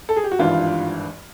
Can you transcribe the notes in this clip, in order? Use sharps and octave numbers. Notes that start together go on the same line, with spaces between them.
A4
G#4
G4
F#4
G#1 G2 E3 F4